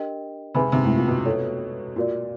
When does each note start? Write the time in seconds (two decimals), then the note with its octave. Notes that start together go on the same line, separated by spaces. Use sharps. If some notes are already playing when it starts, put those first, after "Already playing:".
Already playing: D4 G4 A#4 D#5 G5
0.54 C3 G#4 B4 E5 G#5 B5
0.72 C3
0.85 A2
0.96 A#2
1.08 B2
1.25 F4 A4 C#5
1.96 A#2 F#4 A#4 D5